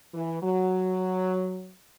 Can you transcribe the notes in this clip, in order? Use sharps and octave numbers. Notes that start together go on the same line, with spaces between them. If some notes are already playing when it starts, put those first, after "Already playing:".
E3
F#3